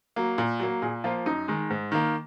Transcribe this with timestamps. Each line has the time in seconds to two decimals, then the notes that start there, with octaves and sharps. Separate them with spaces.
0.16 F#3 A#3
0.38 A#2
0.60 F#3 A#3
0.82 A#2 G#4
1.04 F3 A#3 F4
1.26 F#2 D#4
1.48 D#3 G#3
1.70 G#2
1.92 D#3 A#3